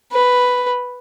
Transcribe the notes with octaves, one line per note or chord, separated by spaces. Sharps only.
B4